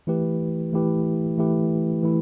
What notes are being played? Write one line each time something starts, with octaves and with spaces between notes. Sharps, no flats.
E3 A3 E4 G4 B4
E3 A3 E4 G4 B4
E3 A3 E4 G4 B4
E3 A3 E4